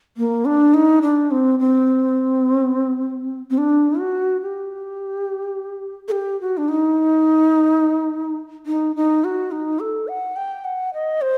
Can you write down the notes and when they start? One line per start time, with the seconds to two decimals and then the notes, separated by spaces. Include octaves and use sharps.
0.17 A#3
0.45 D4
0.74 D#4
1.02 D4
1.31 C4
1.59 C4
3.50 C4
3.58 D4
3.99 F#4
4.42 G4
6.08 A4
6.11 G4
6.41 F#4
6.57 D4
6.68 D#4
8.66 D#4
8.96 D#4
9.24 F#4
9.51 D#4
9.80 A4
10.08 F#5
10.36 G5
10.64 F#5
10.94 D#5
11.21 C5